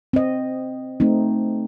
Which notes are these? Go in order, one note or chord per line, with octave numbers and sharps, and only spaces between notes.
C4 D#5
A3 C4 D#4